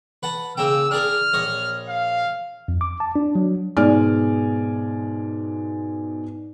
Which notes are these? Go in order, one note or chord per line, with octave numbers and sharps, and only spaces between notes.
B4 F#5 A5
C#3 A#3 G5 E6
D4 G#4 A#4 F6
A#1 C#5 D#5
F5
F2
D6
A5
D4
F#3
G#2 B2 G#3 D5 G#5 F6